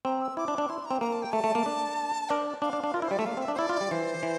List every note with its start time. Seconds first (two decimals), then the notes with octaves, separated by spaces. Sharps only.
0.05 C4 A#5
0.21 E6
0.37 E4 D6
0.48 D4
0.58 D4
0.69 E4 C6
0.85 A#5
0.91 C4
1.01 A#3 A#5
1.12 A5
1.22 G5
1.32 A3 A5
1.44 A3
1.55 A#3
1.66 D4
2.30 D4 A#4
2.38 C5
2.46 D5
2.62 D4 F5
2.73 D4
2.84 D4
2.94 F4 A#4
3.02 E4 C5
3.11 G3 D5
3.19 A3 E5
3.26 A#3 F5
3.37 C4
3.42 E5
3.48 D4
3.54 C5
3.58 E4 D5
3.69 F4
3.81 G3
3.91 E3 C5
4.23 E3